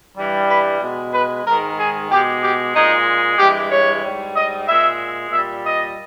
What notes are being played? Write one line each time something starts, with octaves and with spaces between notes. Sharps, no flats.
G2 E3 G3
B4
B2 G#3
B4
G#2 D#3 G#3 A#4
G#4
B2 G#3 G4
G4
A#2 G#3 D#4
G2 E3 G#3 G4
C#5
G#2 G3
D#5
A#2 G#3 E5
A#2 G3 E5
D#5